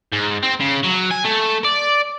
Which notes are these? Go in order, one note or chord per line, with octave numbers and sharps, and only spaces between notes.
G#2
C4
C#3
F#3
G#5
A3
D5